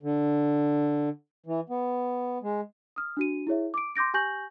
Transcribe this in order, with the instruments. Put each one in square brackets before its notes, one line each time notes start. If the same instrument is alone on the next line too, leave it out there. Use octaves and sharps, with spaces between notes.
[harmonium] D3
E3
B3
G#3
[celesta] D#6 F6
D4 F#4 D#7
E4 G#4 C#5 E5
D6 D7
C6 D6 G6 A#6 D7
G4 G#5 C#6 G6 A#6 F#7